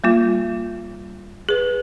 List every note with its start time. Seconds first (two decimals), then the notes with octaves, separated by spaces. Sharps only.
0.04 G3 A#3 F4
1.49 G#4 B4